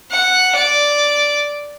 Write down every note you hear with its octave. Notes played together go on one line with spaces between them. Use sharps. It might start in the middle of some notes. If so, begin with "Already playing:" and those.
F#5
D5